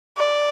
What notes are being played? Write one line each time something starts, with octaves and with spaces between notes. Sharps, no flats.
D5